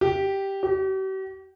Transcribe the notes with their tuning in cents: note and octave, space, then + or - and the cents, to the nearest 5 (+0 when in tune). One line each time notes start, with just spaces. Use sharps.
G4 -5
G4 -45